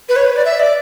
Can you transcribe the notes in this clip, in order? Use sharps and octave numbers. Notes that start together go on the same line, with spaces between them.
B4
C#5
B4
D5
E5
D5